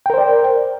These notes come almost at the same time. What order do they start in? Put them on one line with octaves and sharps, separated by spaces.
G5 A#4 C5 D5